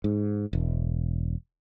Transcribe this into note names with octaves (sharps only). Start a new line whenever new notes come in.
G#2
E1